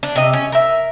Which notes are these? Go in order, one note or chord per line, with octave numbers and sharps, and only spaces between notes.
D4
C3 D#5
C#4
A#4 E5